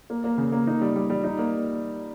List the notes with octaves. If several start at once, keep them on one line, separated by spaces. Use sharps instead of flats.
A#3
A#3
C#3
A#3
D#4
G3
G3
G3
D#4
A#3